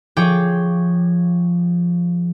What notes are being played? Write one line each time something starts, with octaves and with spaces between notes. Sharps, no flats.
F3 G#4 C#5 G5 D6